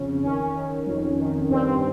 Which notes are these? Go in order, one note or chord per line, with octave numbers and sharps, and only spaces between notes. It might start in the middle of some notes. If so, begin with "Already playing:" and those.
Already playing: F2 C#3 C#4
D#3 C#4
D#3
F2
D#3
G2 C4